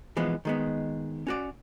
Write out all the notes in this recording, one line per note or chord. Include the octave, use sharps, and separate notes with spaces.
E3 F3 G#3 B3
D#3 G#3 B3
C#4 F#4 D5